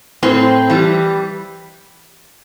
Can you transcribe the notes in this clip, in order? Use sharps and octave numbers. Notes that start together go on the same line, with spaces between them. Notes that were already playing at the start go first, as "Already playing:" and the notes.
A2 C4
E3 G3